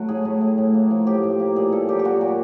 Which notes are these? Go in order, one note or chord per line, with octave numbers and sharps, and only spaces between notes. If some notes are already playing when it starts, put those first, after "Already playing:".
Already playing: F#3 A3 F#4
A2 G#4
A2
A3
A2
A#3
F3
A2 G4
A2
A#3
A#2 G#4
A#3 A4
F#3 G4
G4
A#2 F#4
A#2